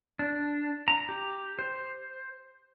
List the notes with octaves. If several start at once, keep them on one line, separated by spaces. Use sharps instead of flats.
D4
A#5
G4
C5